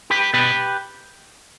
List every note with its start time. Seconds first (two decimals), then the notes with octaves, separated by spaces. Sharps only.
0.10 G4 B4
0.33 B2 B3 G4 B4